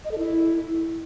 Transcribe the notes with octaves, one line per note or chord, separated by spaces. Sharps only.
D#5
A4
E4